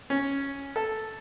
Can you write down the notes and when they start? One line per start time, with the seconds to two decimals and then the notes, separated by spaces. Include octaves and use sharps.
0.10 C#4
0.76 A4